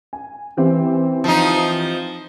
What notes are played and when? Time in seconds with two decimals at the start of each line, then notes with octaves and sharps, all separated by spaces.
0.13 G#5
0.57 E3 C4 G4
1.24 F3 D#4